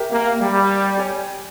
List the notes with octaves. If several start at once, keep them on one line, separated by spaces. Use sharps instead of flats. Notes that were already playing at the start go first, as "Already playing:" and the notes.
Already playing: G4 A#4 E5
A#3
G3
G4 C#5 G#5